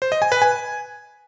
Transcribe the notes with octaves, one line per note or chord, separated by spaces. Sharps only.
C5
D#5
G#5
B4
G#5